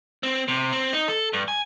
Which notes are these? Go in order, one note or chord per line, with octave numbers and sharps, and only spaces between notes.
C4
C3
C4
D#4
A4
G2
G#5